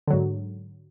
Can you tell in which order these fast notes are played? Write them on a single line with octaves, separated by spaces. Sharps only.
D3 F#3 G#2